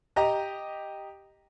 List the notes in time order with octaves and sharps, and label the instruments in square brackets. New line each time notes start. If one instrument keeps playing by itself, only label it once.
[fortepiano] G4 D#5 A#5